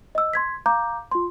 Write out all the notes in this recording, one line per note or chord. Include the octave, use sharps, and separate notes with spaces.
D#5 E6
C6 G#6 B6
F5 A#5 D6 G6
F4 C6